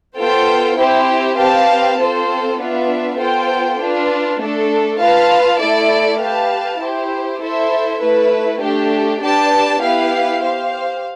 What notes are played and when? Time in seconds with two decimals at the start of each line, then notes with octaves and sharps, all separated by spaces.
0.18 B3 F4 A4 C5 G5
0.78 C4 E4 G4 C5
1.38 C4 G4 B4 F5 A5
1.98 C4 F4 A4 C5
2.58 B3 D4 F4 B4 E5
3.19 B3 F4 A4 C5 G5
3.79 D4 F4 B4
4.39 A3 D4 A4
4.99 F4 B4 F5 A5
5.60 A3 E4 A4 D5
6.20 G4 B4 F5 A5
6.80 E4 G4 C5
7.40 E4 A4 C5 E5
8.01 A3 E4 B4
8.61 A3 D4 G4
9.22 D4 G4 B4 D5 A5
9.81 B3 E4 G4 B4 F5
10.42 G4 C5 F5